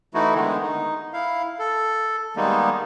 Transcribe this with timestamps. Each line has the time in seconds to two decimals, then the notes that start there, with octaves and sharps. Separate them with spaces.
0.14 E3 A3 D#4 E4 F#4
0.35 D3 D#3 G#3 B3
0.61 D#4
1.13 E4 F5
1.59 A4
2.36 D#3 G3 G#3 A#3 B3 D#4